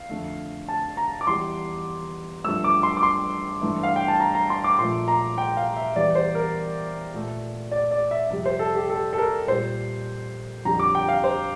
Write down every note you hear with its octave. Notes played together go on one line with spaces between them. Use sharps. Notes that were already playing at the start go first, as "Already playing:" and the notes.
Already playing: F5
F2 D3 A3
A5
A#5
D6
E2 E3 G3 C6
G2 F3 A3 E6
D6
C6
D6
C6
G2 E3 A3
F5
G5
A5
A#5
A#5
C6
D6
A#2 F3 A3 C6
A#5
G5
F5
E5
E2 E3 G3 D5
C5
A#4
A#2 A3
D5
D5
E5
F2 C3 G3 E5
C5
A4
G4
A4
A4
A#4
A#2 G3 C5
F2 D3 G3 A#5
D6
G5
F5
C5